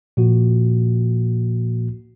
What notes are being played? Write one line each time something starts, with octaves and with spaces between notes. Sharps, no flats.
A#2 F3 A#3 F#4